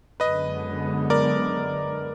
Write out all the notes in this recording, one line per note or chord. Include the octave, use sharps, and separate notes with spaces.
F#2 D3 G#3 B3 B4 D#5
A#4 D5